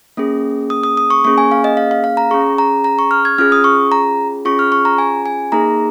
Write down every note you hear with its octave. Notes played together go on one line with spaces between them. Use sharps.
A#3 C#4 G#4
D#6
D#6
D#6
C#6
A#3 C#4 G#4 C#6
G#5
F5
D#5
F5
F5
F5
A#5
C#4 G#4 C#6
A#5
A#5
C#6
F6
G#6
C#4 F4 G#4 F6
D#6
C#6
A#5
C#4 F4 G#4 C#6
F6
C#6
A#5
G#5
G#5
A#3 D#4 G#4 A#5